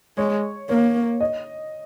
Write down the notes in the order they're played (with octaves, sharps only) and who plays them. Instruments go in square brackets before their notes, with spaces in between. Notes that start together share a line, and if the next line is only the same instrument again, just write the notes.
[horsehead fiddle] G#3 [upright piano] C#5
[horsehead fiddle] A#3 [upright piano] C#5
[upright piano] D#5